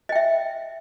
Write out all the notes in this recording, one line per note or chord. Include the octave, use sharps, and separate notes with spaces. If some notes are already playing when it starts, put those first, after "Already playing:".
D#5 E5 G5